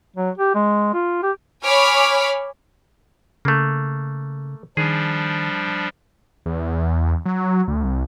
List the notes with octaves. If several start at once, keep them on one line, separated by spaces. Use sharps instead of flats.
F#3
G4
G#3
F4
G4
C#5 G#5 B5 D6 F6
C#3 A3 A#3
D#3 F3 G3 D4 G#4
E2
F#3
D2
C2